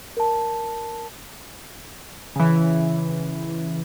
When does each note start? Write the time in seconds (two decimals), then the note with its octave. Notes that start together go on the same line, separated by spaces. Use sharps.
0.17 A#4 A5
2.36 C#3 E3